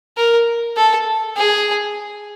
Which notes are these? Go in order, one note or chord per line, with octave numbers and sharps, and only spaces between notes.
A#4
A4
G#4